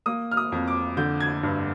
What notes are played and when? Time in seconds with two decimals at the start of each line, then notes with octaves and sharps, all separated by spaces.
0.06 A#3 D#6
0.31 F6
0.37 D#6
0.52 F2
0.68 D6
0.97 D3 G6
1.20 G#6
1.43 G2